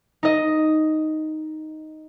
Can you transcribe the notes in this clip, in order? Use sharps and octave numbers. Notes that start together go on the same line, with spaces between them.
D#4 D#5